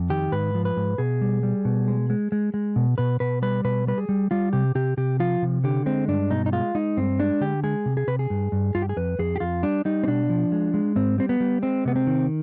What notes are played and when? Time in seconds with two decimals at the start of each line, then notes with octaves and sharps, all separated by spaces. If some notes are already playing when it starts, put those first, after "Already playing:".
Already playing: F2
0.10 D#3 G4
0.32 G#2 B4
0.55 F3
0.65 B4
0.77 G#2
0.98 B2 G#4
1.21 G3
1.43 G3
1.65 B2
1.88 G#3
2.10 G#3
2.32 G#3
2.54 G#3
2.76 B2
2.98 B2 B4
3.20 B2 B4
3.42 G3 B4
3.64 B2 B4
3.87 G3 B4
3.98 G#4
4.09 G3
4.31 G3 F4
4.53 C3 G4
4.75 C3 G4
4.97 C3 G4
5.20 F3 F4
5.42 C3
5.64 D3 G4
5.86 G#3 C4
6.08 G2 D4
6.30 B2 D#4
6.46 D#4
6.53 G#3 F4
6.75 G#3 D#4
6.97 G2 C4
7.19 G#3 D4
7.41 D3 G4
7.63 G#3 G#4
7.86 C3
7.97 G#4
8.07 C3 B4
8.19 G#4
8.30 G2
8.52 G2
8.75 G2 F4
8.82 G4
8.89 G#4
8.97 F2 B4
9.19 F2 G#4
9.36 G4
9.40 F2 F4
9.63 G3 D4
9.85 G3 D#4
10.03 C4
10.07 B2 D4
10.30 F3
10.52 G#3
10.74 G#3
10.96 G#2 C4
11.18 G3 C4
11.29 B3
11.40 G3
11.62 G#3 C4
11.85 C3 B3
11.96 C4
12.07 D#3